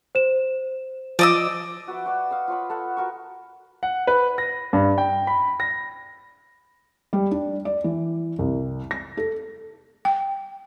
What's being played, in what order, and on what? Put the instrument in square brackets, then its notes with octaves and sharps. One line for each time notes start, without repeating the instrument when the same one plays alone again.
[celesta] C5 E7
[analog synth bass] F3 [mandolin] D5 D#5 E6
[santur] F#4 B4 E5
F#4 B4 D5
D#5 F5 C#6 D#6
F4 C#5 B5
A4 C#5 F#5 B5
F#4 A#4 C#6
[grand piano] F#5
B4
A#6
G2
G5
B5
A#6
[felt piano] G3
D4
D5
E3
C2
A#6
A4
[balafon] G5